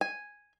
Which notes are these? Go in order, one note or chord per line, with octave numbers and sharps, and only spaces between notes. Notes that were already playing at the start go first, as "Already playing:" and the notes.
G#5